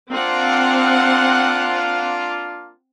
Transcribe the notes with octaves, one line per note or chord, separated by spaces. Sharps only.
A#3 C4 D4 F4 F#5